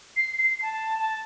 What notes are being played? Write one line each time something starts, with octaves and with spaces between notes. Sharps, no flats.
C7
C7
A5
A5